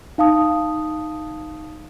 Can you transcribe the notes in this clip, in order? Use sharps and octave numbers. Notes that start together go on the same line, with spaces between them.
D#4 F5 A5 D#6